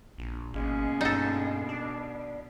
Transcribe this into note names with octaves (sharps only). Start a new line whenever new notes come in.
A#1
G#1 B2 G#3 A#3 C#4
G2 D#4 A4
D4